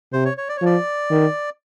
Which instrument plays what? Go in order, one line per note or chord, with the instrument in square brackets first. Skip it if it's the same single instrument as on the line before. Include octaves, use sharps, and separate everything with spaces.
[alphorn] C3 [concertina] C5
[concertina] C#5
C#5
D5
C#5
[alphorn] F3 [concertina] D5
[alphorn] D#3